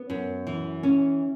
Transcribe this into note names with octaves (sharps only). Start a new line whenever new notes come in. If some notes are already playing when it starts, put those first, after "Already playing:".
Already playing: B3
F#2
E3
C#4